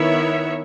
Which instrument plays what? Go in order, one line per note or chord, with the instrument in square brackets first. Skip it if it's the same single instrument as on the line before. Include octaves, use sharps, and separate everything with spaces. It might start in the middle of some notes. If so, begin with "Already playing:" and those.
Already playing: [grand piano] D#3 [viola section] B3 E4 A#4 C#5 E5